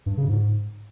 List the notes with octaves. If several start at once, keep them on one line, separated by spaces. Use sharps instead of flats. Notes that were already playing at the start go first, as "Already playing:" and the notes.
G2
C#3
G#2